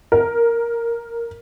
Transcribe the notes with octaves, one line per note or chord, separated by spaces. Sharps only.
A#4